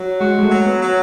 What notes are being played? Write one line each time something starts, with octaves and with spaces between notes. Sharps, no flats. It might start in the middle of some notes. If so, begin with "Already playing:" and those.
Already playing: F#3
G#3 F#4
G#3
A3
F#3
B3
F#3